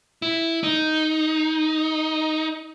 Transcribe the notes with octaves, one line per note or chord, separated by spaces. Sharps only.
E4
D#4